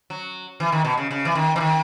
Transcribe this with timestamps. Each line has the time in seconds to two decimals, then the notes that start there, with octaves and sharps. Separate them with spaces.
0.10 F#3
0.60 E3
0.72 D#3
0.85 B2
0.97 C#3
1.11 C#3
1.25 E3
1.35 D#3
1.56 E3
1.61 D#3